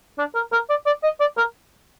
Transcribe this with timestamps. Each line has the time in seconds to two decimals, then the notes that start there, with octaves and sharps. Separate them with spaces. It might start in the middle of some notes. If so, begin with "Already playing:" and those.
0.18 D4
0.35 A#4
0.52 A#4
0.70 D5
0.86 D5
1.03 D#5
1.20 D5
1.37 A#4